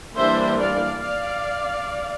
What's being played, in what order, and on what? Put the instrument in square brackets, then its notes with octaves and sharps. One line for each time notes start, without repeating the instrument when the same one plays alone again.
[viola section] E3 G3 A#3 D4 C5 E5
D5 F5
D5 F5